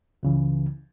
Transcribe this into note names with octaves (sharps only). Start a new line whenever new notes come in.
C#2 C#3 E3